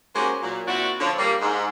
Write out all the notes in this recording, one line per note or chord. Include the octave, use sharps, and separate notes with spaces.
G#3 A#3 C#4 F#4 G4 C5
A#2 F#3
A#2 C4 D4 E4 F#4
D3 F3 C#5
G3 A#3
G#2